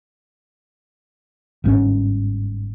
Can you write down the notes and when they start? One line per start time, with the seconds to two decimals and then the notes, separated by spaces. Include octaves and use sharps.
1.64 G1 G#2 D3 C#4